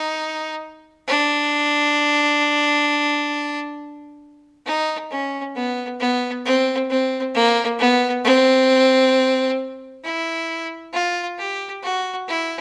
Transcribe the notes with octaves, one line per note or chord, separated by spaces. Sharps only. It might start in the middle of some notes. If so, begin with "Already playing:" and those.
Already playing: D#4
D4
D#4
C#4
B3
B3
C4
C4
A#3
B3
C4
E4
F4
G4
F#4
E4